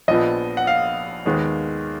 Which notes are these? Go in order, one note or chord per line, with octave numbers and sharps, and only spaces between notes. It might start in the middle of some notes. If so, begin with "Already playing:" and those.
A#1 A#2 F3 B3 D#5
F#5
F5
D#2 D#3 G#3 B3